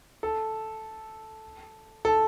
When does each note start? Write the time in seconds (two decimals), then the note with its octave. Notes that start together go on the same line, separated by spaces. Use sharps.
0.23 A4
2.05 A4